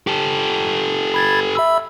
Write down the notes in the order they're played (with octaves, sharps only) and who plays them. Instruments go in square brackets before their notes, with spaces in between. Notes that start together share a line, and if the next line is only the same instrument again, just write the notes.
[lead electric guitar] G4 A4
[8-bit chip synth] B5 G#6 A6
E5 B5 E6